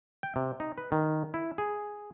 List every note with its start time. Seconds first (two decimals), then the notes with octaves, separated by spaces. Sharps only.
0.23 G5
0.36 C3
0.60 D#4
0.78 B4
0.92 D#3
1.34 E4
1.58 G#4